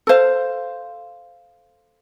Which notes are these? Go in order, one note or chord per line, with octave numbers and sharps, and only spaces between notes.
A4 C5 F5